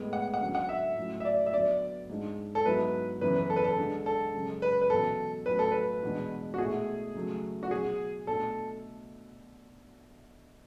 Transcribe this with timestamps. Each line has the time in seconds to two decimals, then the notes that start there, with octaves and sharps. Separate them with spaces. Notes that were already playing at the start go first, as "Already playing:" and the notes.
Already playing: A2 G#3 B3
0.13 F#5
0.34 F#5
0.41 D3 F#3 C#4
0.55 F#5
0.69 E5
0.97 A2 F#3 C#4 E4
1.20 E5
1.25 D5
1.46 E5
1.53 D3 F#3 B3 D5
2.10 G#2 G#3 D4
2.55 A4
2.66 G#2 F#3 B3 E4 B4
3.21 F#2 C#3 E3 B3 E4 B4
3.36 B4
3.50 A4
3.56 B4
3.64 A4
3.78 D3 G#3 D4
4.06 A4
4.34 F#2 C#3 G#3 C#4
4.62 B4
4.81 B4
4.90 E2 B2 F#3 C#4 E4 A4
5.46 A2 F#3 A3 C#4 B4
5.59 A4
5.71 B4
6.02 E2 B2 G#3 D4
6.54 F#4
6.58 B2 A3 E4 G#4
7.15 C#3 F#3 A3
7.63 F#4
7.71 B2 F#3 C#4 G#4
8.27 B2 A3 D4 A4